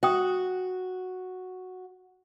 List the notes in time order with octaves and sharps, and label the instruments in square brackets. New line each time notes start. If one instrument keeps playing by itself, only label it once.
[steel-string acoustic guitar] F#4 [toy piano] E5 G5 D#6